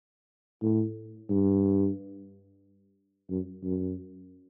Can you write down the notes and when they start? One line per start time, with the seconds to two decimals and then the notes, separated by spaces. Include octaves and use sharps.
0.62 A2
1.30 G2
3.30 F#2
3.64 F#2